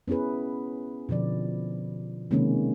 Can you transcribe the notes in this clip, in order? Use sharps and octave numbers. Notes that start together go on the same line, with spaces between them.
B3 C#4 E4 G#4 B4
B2 D3 F3 D5
C3 D#3 G#3 A#3 C#4